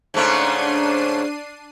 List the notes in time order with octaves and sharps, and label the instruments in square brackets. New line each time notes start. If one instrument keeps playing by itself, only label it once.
[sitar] G#2 C#3 A3 [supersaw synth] D4 C7 D#7